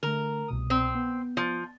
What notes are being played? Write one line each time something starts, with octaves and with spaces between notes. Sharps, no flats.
D3 A3 A#4
C2 B2 D#6
C4
B3
F3